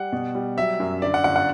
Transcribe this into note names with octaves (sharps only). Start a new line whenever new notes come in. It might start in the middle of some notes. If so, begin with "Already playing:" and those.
Already playing: G3 F#5
B2
G3
F#3 E5
F#2
D3 D5
F#5
G1 F#5
F#5